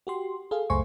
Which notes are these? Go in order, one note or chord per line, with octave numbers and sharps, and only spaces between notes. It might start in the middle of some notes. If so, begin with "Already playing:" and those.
F#4 G4 C6
G#4 A4 F5
C#2 F#2 A3 C5 G#5 C#6